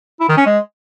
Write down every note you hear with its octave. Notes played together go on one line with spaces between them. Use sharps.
E4
D#3
C#4
G#3